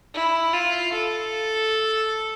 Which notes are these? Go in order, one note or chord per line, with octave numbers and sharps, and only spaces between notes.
E4
F4
A4